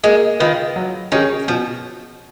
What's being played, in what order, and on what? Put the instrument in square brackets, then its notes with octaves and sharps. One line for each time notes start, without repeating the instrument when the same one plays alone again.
[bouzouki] G#3 [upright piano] A#3
[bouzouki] D#3 [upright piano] F4 B4
[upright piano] F#3
[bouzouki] D#3 [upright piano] C#4 G#4
[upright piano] B2 [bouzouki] F3